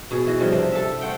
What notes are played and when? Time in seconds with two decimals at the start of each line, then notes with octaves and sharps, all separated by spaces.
0.11 B2 G#4
0.26 E3 D#5
0.40 C#3 F3 G3
0.52 C3 D4
0.72 A4 E5
1.01 A3 C5 F#5 G5